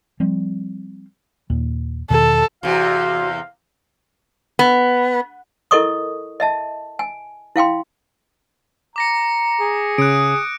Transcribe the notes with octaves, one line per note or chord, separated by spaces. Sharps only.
F3 G3 C4
D#2 A#2
E2 B2 D#3 A4
E2 C3 F#4 F5
B3
E4 A4 A#4 D#5 C#6 D#6
D#5 E5 A5
G#5
E4 F5 G5 C6
A#5 D6 A#6 C#7
G#4
C#3 D#6 F#6 D7